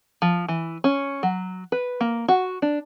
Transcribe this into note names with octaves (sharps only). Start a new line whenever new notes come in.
F3
E3
C#4
F#3
B4
A#3
F#4
D4